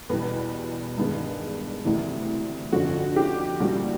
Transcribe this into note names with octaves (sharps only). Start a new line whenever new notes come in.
E2 B2 G3 B4
G2 D#3 G#3 B3
D2 C3 E3
G1 F2 D3 F3 F#4
G4
C2 A#2 G3 F#4